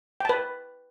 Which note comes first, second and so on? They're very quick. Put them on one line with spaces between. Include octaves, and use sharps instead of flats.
G5 A5 B4